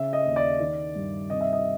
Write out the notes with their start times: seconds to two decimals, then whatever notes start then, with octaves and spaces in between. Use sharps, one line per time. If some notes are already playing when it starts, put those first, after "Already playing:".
Already playing: C#3 E5
0.13 D#5
0.25 D#2
0.36 D5
0.59 D#3
0.95 G2
1.30 C3 D#5
1.41 E5
1.53 D#5